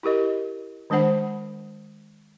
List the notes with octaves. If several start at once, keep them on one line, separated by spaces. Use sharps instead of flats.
E4 G4 A#4 D#5
D#3 G#3 D4 C5 F#5 B5